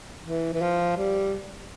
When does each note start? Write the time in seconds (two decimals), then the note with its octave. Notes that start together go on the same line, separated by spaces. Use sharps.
0.25 E3
0.53 E3
0.62 F3
0.97 G3